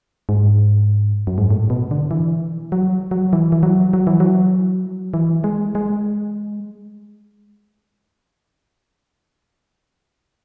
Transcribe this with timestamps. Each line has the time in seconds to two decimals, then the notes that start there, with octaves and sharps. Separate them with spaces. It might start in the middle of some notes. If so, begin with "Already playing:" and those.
0.29 G#2
1.27 F#2
1.38 G#2
1.51 A2
1.70 B2
1.91 D3
2.11 E3
2.72 F#3
3.11 F#3
3.33 E3
3.52 E3
3.63 F#3
3.93 F#3
4.07 E3
4.20 F#3
5.14 E3
5.44 G#3
5.75 G#3